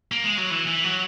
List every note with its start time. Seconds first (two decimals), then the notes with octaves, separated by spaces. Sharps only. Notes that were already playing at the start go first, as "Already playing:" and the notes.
0.12 A#3
0.24 G#3
0.37 F#3
0.50 E3
0.67 E3
0.84 F#3